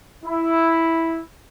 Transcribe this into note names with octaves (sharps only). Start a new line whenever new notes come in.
E4